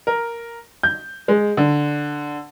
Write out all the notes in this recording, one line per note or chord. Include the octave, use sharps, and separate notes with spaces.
A#4
G6
G#3
D3